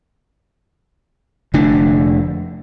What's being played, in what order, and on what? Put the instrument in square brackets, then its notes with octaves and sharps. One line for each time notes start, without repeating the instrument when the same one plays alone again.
[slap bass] F1 D3 A3 D4